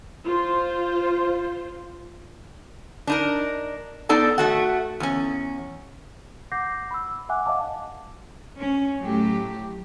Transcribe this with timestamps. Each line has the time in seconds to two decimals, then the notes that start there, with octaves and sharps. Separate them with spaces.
0.23 F4 C5
3.07 D4 D#4 A#4
4.09 B3 D#4 A4 D5 A5
4.38 A3 F#4 F#5
5.00 E2 C#4
6.52 F#5 D6 G6 A#6 C7
6.91 B5 E6
7.29 E5 F#5 G#5 D6 F#6
7.45 D#5 F5 F#5 A5 D6
8.59 C#4
8.99 A2 F#3 A3 G4